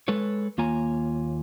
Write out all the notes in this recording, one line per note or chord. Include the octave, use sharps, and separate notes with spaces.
G#3 A4 B4 C#5
D#2 A#3 F4 C#5 G#5 A#5